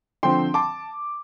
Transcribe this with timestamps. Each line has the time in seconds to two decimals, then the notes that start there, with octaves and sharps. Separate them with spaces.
0.23 D3 F3 C4 G5 C6
0.54 A5 D6